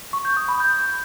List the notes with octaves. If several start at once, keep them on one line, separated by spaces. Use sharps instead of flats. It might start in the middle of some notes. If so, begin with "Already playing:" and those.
C#6
G6
D#6
B5
G6